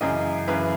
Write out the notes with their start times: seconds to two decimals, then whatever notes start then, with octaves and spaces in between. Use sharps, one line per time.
0.01 F#2 C#3 E3 D#5
0.48 F#2 C#3 E3 B4